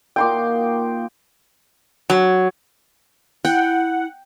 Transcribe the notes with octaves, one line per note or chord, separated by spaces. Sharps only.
A#2 D#4 F#4 G5 C6 D6
F#3
E4 F#5 G5